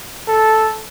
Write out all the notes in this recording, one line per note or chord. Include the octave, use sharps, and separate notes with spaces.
A4